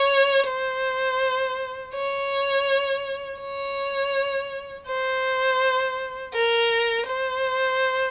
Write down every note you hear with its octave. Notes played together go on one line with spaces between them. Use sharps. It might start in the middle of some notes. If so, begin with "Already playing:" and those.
Already playing: C#5
C5
C#5
C#5
C5
A#4
C5